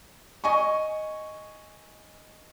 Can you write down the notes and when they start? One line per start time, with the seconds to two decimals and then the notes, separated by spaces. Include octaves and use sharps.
0.44 D#5 G#5 C#6